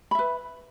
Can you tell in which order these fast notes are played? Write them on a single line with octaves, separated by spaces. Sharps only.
B5 E5 B4